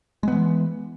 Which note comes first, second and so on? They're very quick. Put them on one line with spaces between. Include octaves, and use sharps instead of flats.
G#3 B3 E3